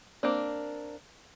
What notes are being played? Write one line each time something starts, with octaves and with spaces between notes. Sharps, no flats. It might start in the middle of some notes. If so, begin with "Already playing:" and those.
A#3 C4 D4